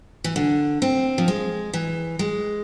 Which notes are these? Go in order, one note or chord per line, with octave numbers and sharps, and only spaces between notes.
E3
D3
C4
F3
G#3
E3
G#3